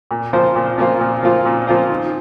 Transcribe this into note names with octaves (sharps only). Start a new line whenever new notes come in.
A#2
F3 A#3 F4 C5
A#2
F3 A#3 F4 C5
A#2
F3 A#3 F4 C5
A#2
F3 A#3 F4 C5
D#3